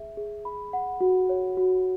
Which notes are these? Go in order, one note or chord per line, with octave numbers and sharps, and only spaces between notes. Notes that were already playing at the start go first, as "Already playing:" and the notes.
Already playing: G#4 E5
G#4
B5
F#5
F#4
C#5
F#4